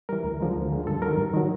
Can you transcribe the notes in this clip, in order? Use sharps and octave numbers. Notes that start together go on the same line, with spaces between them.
E3 G3 A#4
D2
D3 F3 G#3
D2
D3 F3 G#3
G2 A4
D#3 F#3 A#4
G2
D#3 F#3